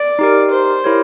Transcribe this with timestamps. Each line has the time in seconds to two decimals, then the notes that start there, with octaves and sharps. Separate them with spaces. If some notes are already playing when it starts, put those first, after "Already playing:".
Already playing: D5
0.19 D#4 G4 A#4
0.52 C5
0.84 E4 G4 A#4 C#5